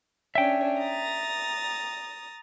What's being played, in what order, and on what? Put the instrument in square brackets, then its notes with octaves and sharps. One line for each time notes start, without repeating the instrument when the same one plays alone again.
[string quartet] C#4 D4 [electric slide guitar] E5 G5
[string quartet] A#5 D#6 A6